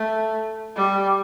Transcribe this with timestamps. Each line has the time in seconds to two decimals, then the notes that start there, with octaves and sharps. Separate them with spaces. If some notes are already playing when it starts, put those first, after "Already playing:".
Already playing: A3
0.76 G3